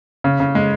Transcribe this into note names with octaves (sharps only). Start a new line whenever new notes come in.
C#3
C#3
G#3